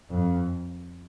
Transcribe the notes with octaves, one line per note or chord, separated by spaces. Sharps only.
F2